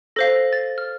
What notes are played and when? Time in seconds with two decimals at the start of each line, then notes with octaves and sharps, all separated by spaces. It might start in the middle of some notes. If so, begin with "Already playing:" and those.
0.16 A4 C5 F5 A#6
0.53 A6
0.78 F6